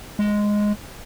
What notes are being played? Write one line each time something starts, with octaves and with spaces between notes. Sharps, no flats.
G#3